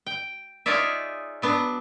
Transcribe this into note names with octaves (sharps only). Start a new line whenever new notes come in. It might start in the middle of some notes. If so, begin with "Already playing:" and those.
G5
D#4 F4 G#4 C#5 D5 E5
F#3 B3 D4